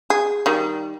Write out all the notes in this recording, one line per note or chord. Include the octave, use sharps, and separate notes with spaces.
G#4
D#3 G3